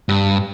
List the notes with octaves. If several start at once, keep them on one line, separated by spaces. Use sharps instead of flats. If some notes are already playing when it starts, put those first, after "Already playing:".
G2